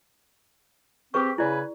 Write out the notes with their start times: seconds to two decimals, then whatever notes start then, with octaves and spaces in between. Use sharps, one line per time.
1.14 C4 G4 G#4 B4 C#6
1.38 C#3 E4 B4 D5 G#5